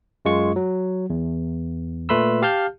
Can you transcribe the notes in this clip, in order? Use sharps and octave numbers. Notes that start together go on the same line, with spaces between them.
F#2 G#3 F4 C#6
F#3
E2
A#2 A3 B4 B5 C6 E6
G4 F5 A5 F6 G6